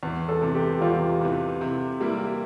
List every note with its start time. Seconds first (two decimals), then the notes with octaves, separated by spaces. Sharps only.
0.03 E2
0.29 A4
0.41 C3 E3
0.55 G4
0.81 E2 F4
1.21 C3 E3
1.61 C3
2.01 G3 A#3 E4